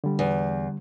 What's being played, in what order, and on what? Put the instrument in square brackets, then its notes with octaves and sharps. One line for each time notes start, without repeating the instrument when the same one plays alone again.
[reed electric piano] D3 G3
[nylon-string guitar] E2